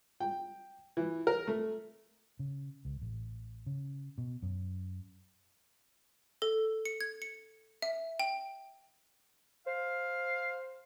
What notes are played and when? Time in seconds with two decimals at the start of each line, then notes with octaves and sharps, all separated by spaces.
0.20 G5
0.97 E3
1.27 A#4
1.47 A3
2.39 C#3
2.85 C#2
3.01 A1
3.66 C#3
4.18 B2
4.42 F#2
6.42 A4
6.85 C#7
7.01 G#6
7.22 C#7
7.82 E5
8.20 G5
9.67 C5 F5